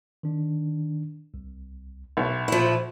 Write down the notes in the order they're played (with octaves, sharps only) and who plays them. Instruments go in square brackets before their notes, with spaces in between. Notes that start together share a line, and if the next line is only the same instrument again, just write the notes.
[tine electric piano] D#3 D4
C2
[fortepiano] B1 [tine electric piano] B2 E5
[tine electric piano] A#2 [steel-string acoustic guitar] F3 E4